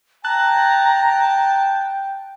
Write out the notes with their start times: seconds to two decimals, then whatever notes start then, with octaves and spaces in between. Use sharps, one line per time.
0.25 G5 A5 A#5 F#6